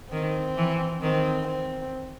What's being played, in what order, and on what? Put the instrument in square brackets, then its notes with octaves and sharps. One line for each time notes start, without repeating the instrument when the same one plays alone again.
[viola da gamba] D#3 [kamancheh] C4
[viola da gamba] E3
[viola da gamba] D#3 [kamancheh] C4
[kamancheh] C4